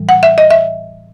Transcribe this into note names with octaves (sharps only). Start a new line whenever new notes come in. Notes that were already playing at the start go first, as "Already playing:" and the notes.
Already playing: A2 E3 G3
F#5
E5
D#5
E5